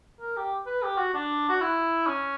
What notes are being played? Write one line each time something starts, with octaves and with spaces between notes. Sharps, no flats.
A#4
G4
B4
G4
F#4
D4
F#4
E4
C#4